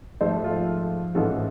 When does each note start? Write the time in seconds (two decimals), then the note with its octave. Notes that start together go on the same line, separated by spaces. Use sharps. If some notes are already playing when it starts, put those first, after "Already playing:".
0.21 G#2 F3 A3 A4 C5
0.44 F4 A4
1.15 A1 G#2 E3 F4 A4